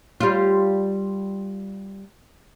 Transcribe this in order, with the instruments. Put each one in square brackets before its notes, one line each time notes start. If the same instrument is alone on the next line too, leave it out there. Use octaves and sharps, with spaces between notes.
[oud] G3 F4